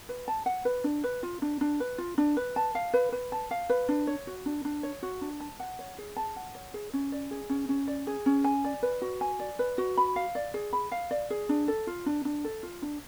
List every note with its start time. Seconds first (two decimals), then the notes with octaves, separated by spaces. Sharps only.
0.09 B4
0.28 A5
0.46 F#5
0.65 B4
0.84 D4
1.04 B4
1.23 F4
1.42 D4
1.61 D4
1.80 B4
1.98 F4
2.18 D4
2.37 B4
2.56 A5
2.75 F5
2.93 B4
3.12 B4
3.32 A5
3.51 F5
3.69 B4
3.89 D4
4.07 C#5
4.27 F#4
4.46 D4
4.65 D4
4.83 C#5
5.03 F#4
5.21 D4
5.40 A5
5.60 F#5
5.79 C#5
5.98 G#4
6.16 A5
6.36 F#5
6.55 C#5
6.74 G#4
6.93 C#4
7.12 D5
7.31 G#4
7.49 C#4
7.69 C#4
7.87 D5
8.07 G#4
8.26 C#4
8.44 G#5
8.64 D5
8.83 B4
9.02 F#4
9.21 G#5
9.39 D5
9.59 B4
9.78 F#4
9.97 B5
10.16 F5
10.35 D5
10.54 G#4
10.73 B5
10.92 F5
11.11 D5
11.30 G#4
11.49 D4
11.68 A4
11.87 F4
12.06 D4
12.25 D4
12.44 A4
12.63 F4
12.82 D4